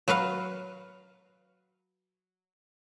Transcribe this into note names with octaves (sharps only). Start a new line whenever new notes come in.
F#3 F#4 B4 F5